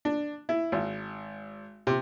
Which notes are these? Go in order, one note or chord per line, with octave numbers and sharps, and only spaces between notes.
D4
E4
G#1
C3